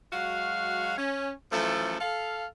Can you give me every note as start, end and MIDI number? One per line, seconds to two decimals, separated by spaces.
0.12 0.94 54
0.12 0.94 56
0.12 0.94 66
0.12 0.94 77
0.98 1.31 61
1.51 1.96 42
1.51 1.96 52
1.51 1.96 53
1.51 1.96 57
1.51 1.96 69
2.00 2.46 69
2.00 2.46 77